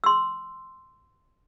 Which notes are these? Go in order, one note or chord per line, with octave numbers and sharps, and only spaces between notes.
C6 E6